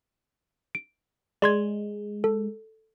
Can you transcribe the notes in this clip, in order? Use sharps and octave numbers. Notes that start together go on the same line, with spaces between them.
D7
G#3 D5 C6 G#6
A4